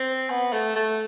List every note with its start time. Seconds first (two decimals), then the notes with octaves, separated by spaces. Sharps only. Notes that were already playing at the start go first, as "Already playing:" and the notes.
Already playing: C4
0.30 B3
0.53 A3
0.76 A3